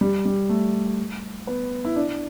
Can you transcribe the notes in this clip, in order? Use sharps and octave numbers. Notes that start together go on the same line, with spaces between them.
G3
G3
A3
B3
E4
D4